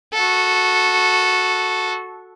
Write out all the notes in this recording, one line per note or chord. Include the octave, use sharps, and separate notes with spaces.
F#4 A4